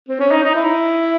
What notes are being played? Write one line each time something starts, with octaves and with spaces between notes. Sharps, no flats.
C4
C#4
D#4
D#4
E4